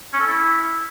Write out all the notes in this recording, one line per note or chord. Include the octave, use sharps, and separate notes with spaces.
C#4
A4
E4